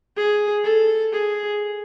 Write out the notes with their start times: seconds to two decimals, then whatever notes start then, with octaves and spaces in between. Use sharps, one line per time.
0.16 G#4
0.64 A4
1.13 G#4